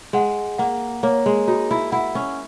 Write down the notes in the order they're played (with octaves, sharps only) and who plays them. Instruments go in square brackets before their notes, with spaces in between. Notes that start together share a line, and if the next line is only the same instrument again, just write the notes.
[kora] G#3 [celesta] F#5
[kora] A#3 [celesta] F#5
[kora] A#3 [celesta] C#5
[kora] G#3
[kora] D#4 [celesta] F#4
[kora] E4
[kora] E4 [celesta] F#5
[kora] C#4